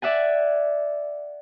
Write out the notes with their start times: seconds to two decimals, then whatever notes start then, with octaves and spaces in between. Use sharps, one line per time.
0.02 D5 E5 F#5 G#5